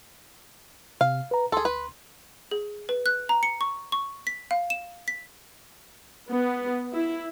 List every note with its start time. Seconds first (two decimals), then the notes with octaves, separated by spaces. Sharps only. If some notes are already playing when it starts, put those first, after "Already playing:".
1.01 C3 F5
1.31 B4 A#5
1.52 D2 G#4 A4 C6
1.65 B4
2.51 G#4
2.89 B4
3.06 F#6
3.29 A#5
3.43 C#7
3.61 C#6
3.92 C#6
4.27 B6
4.51 F5
4.70 E7
5.08 B6
6.29 B3
6.94 E4